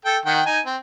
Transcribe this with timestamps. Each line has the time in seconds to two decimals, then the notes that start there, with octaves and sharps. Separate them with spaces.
0.05 A4 G5
0.26 D#3 F#5 G5
0.46 D#4 G#5
0.65 C4